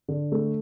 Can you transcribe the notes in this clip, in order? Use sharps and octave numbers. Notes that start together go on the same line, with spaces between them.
D3
A3